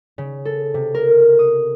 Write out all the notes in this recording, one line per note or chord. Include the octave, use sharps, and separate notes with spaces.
C#3
A4
C3
A#4
D#6